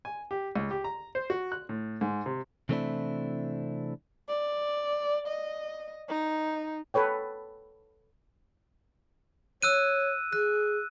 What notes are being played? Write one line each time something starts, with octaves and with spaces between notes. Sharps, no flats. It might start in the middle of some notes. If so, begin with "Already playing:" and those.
G#5
G4
C#2
G4
A#5
C5
F#4
F#6
A2
G#2
C3
C3 E3 A3 C4 D4 E4
D5
D#5
D#4
A4 B4 C#5 G5
C#5 E6 F#6 D#7
G#4 F#6